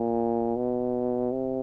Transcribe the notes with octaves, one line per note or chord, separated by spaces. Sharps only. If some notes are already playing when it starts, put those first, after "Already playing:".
Already playing: A#2
B2
C3